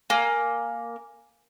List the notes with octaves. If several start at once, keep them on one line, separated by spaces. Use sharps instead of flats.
A#3 G#5